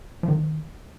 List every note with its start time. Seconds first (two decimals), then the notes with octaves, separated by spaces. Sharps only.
0.23 F3
0.28 D#3